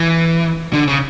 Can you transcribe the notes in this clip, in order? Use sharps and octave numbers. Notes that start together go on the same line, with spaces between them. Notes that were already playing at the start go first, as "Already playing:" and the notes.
Already playing: E3
D3
C#3